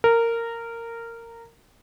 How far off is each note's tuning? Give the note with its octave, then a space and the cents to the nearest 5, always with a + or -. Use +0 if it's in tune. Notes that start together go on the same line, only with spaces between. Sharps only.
A#4 -15